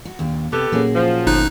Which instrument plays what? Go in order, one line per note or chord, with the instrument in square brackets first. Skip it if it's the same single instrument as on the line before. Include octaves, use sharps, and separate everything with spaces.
[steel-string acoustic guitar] F#4
D#2 A#2 D4
[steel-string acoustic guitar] C3 [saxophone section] B3 G4 A4
[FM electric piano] A#2 A#3 C#4 [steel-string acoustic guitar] F#3 F#4 G#4
[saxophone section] F3
[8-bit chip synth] G1 D#4 F#6